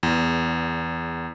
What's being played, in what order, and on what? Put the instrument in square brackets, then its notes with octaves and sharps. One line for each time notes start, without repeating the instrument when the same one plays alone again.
[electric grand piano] E2